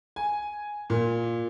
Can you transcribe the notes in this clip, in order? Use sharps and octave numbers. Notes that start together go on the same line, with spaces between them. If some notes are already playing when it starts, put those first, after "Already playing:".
G#5
A#2